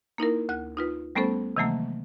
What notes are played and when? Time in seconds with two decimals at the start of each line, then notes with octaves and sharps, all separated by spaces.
0.18 A#3 D#4 E4 A#4
0.49 D2 F#6
0.77 D#4 F4 B4
1.15 G3 A3 B3 C#4 A4 C5
1.56 C3 D#3 E3 F#3 A3 A#3